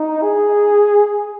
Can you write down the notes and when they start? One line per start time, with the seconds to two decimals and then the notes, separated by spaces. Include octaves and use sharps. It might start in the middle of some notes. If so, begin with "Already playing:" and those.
Already playing: D#4
0.22 G#4